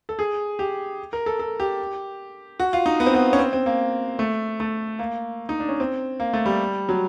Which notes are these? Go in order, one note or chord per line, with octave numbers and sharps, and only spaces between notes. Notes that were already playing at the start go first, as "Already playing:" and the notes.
A4
G#4
G4
A#4
A4
A4
G4
F#4
F4
D#4
B3
C4
B3
C#4
C4
C4
A#3
A3
A3
A#3
D#4
D4
C#4
C4
A#3
A3
G3
F#3